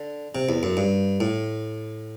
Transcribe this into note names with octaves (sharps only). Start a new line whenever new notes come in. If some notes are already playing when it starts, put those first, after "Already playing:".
Already playing: D3
C3
E2
F#2
G2
A2